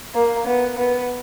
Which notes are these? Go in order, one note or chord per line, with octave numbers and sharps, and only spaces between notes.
A#3
B3
B3